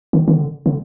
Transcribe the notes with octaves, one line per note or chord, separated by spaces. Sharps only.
D#3
D#3
D3
D3